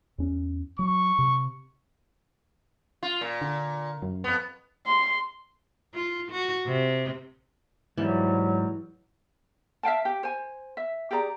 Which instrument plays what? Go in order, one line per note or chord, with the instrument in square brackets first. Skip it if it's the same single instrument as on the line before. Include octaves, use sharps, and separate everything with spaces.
[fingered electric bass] E2 C#4
[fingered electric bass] F#3 [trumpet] C#6
[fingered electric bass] C3
[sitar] F4
A#2
[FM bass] D3
F#2
[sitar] F2 B3
[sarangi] C6
[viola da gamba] F4
F#4
C3
[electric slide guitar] G#2 G3 [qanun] E3 [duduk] F#3
[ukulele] E5 F5 G5 A5
G4 G5
C5 G#5
E5
G4 G#4 D5 A#5